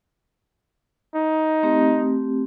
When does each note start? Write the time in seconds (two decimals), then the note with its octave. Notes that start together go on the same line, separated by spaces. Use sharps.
1.15 D#4
1.63 A3 C4 G4